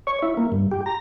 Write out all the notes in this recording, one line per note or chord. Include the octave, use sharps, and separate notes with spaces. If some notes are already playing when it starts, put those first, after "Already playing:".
C#5
E4
A#3
G2
G4
A#5